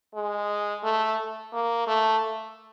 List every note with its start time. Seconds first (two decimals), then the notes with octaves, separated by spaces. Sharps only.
0.14 G#3
0.83 A3
1.53 A#3
1.87 A3